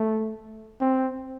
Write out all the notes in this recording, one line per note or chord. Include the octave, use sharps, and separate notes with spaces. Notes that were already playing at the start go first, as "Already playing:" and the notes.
Already playing: A3
C4